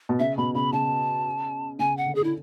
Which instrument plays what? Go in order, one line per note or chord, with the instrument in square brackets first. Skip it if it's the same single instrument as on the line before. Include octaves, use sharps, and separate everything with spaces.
[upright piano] B2
[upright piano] C#3 [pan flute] E5
[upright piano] B2 [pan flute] B5
[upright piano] C#3 [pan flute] B5
[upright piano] C#3 [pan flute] A5
[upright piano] C#3 [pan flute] G#5
[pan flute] F#5
[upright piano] D3
[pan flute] G#4
[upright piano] D3 [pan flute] E4